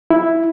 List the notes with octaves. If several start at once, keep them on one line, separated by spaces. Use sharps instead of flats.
E4